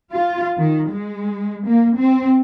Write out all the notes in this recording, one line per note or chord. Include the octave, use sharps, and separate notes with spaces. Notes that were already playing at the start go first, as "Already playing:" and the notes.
F4
D#3
G#3
A#3
C4